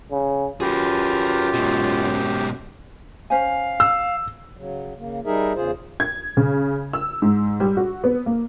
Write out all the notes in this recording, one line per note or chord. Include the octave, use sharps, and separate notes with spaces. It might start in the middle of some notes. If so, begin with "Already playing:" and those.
C#3
F#2 F4 G4 G#4 B4
G#2 B2
C#4 C5 F5 G#5
E6
C#3 F#3
C#3 A#3
G3 D#4 G#4 A#4 E5
E2 C#3 F4 G#4 C5
G#6
C#3
E6
G#2
G3
F#4
B3
A#3